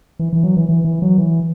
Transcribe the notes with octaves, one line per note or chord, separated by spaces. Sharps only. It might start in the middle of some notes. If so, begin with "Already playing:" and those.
E3
E3
F#3
E3
E3
E3
F#3
E3